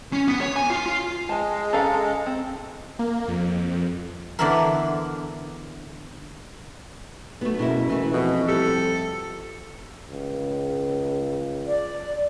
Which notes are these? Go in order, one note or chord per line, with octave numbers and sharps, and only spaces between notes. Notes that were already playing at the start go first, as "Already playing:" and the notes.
C#4
B3
C#5
G#5
F4
F4
G#3 G#5 A5
C#4 A4 F5 A#5
C4
A#3
F2
D3 E3 B3 E4 A4 A#4
B1 A3 B3
F#1 B2 A#3 E4
E3 A3 B3
F2 B2
G3 E4 G4 A4
C#2
D5